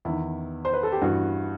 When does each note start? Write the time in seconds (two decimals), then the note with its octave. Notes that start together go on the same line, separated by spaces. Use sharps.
0.05 E2 D#3 E4
0.65 C5
0.74 B4
0.83 A4
0.92 G4
1.01 G2 E3 F#4